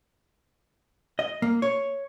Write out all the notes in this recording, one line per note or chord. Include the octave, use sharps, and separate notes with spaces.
D#5
A#3
C#5